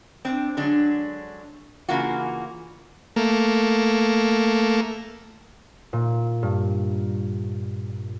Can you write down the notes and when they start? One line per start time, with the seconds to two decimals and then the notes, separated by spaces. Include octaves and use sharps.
0.25 C4 D4
0.57 D3 F#3 G#3 D4
1.88 C#3 E3 A#3 D4 F4 F#4
3.16 A3 A#3
5.93 A#2
6.43 G2